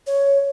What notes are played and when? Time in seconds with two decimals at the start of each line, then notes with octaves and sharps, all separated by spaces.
0.07 C#5